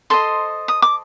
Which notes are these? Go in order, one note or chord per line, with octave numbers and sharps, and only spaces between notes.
A4 C5 D#5 C6
D#6
D6